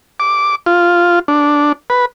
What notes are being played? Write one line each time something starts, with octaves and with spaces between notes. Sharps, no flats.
D6
F4
D4
B4